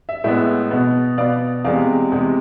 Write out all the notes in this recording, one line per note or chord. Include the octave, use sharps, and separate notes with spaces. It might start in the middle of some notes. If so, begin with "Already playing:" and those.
E5
A2 G#3 B3 E5
B2 B3
B2 B3 D5 F5
E2 C3 G#3 D5 F5
E2 C3 G#3